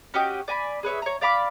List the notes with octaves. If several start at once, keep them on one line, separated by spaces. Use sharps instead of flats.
C#4 F#4 G4 D#5
D5 G#5 A#5 B5
G#4 B4 C#5 E5
C#5 A#5
D5 F5 B5 D6